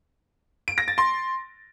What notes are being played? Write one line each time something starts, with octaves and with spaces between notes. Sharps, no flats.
D7
A#6
A6
C6